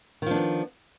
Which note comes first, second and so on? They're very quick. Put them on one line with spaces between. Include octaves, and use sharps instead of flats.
D#3 F3 D4 B3